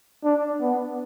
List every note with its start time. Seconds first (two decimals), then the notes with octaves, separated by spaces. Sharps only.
0.24 D4
0.61 B3